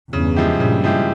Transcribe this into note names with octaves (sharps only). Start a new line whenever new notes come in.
E2 G2 C#3
F3 G#3 E4 G4
G2 A#2 C#3
F3 G#3 E4 G4